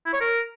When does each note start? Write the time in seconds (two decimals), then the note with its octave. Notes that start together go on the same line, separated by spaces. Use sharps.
0.06 E4
0.13 C#5
0.21 A#4